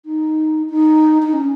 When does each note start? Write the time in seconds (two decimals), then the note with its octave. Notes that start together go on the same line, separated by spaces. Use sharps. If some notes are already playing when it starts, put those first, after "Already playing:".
0.05 D#4
0.70 D#4
1.22 D#4
1.33 C#4